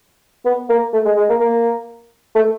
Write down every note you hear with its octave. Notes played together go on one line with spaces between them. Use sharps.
B3
A#3
A3
G#3
G#3
A#3
A#3
A3